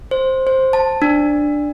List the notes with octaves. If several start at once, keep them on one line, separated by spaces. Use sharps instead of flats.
C5
C5
A5
D4